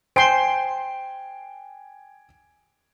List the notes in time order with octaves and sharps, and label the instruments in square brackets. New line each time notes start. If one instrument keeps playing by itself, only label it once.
[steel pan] C5 C6 [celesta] G5 [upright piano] G#5 D7